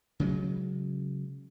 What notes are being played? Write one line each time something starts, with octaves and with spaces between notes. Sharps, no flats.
C#3 F#3 G#3